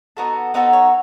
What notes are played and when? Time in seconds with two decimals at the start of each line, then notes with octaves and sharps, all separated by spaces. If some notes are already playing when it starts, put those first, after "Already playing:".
0.17 B3 D#4 F#4 A4
0.54 B3 D#4 F#4 A4 C5
0.73 C#5